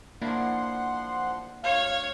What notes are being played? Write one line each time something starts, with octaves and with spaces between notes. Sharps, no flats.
F3 A#3 D4 E4 F#5 C6
D2 C#5 F5